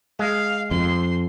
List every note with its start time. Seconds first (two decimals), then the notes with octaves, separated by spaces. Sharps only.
0.19 G#3 F5
0.71 F2 C6